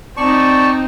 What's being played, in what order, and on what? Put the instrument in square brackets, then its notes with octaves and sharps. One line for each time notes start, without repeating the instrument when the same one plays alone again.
[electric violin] C4 D#4 [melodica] D5 A5 C#6